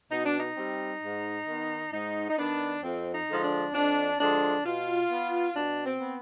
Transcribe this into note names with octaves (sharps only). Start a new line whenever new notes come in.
B2 D#4
D4
D#4
G3 C4
G#2
D#3 B3
G#2 D#4
D#4
D#3 B3 D4
F2 C4
D#4
D3 F3 G#3
D4
F2 D4
D3 F3 G#3 D4
B2 F4
B3
B2 D4
C4
B3